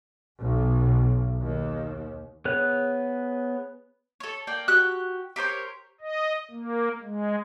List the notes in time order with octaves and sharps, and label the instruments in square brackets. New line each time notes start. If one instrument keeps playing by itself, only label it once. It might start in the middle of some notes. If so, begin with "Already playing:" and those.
[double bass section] B1
D#2
[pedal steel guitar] B3 G#4 C#5 F#6
[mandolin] A4 C#5
A#3 D5 G5
F#4 G4 F#6
G4 A#4 C5 C#5
[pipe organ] D#5
A#3
G#3